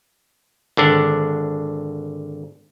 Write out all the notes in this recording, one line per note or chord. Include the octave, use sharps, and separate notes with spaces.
G#1 D3 D4